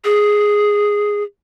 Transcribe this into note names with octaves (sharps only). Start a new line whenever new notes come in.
G#4